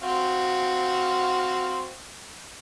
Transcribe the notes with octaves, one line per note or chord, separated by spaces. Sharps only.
C4 F#4 F5